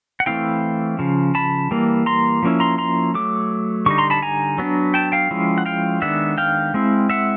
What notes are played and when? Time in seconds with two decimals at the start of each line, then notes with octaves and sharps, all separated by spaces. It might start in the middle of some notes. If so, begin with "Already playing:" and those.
0.20 F#5
0.26 E3 A3 C4 E4 F5 G5
0.99 C#3 F3
1.35 A5 B5
1.71 E3 G3 A#3
2.06 A#5 C6
2.43 F3 A#3 C#4 E4
2.60 A#5 C6
2.78 A#5 C6
3.14 F#3 A3 D6
3.86 D3 G3 D#4 C#6
3.98 A#5 C6
4.10 A5 B5
4.22 G#5 A#5
4.58 F#3 B3 D4
4.94 G5 A5
5.12 F5 G5
5.31 F3 G#3 C#4 E4
5.58 F#5
5.66 F5 G5
6.02 D#3 G#3 B3 D4 E5 F#5
6.38 F5 G5
6.74 G#3 C4 E4
7.10 E5 F#5